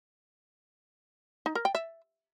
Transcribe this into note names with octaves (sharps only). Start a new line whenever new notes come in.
D#4
A#4
G5
E5